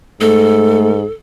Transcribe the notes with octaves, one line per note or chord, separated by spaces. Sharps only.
G#2 A3 A4